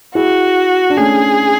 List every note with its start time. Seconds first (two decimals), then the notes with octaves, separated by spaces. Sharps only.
0.15 E4 F#4 G#4
0.90 D4
0.97 A3 C#4 G#4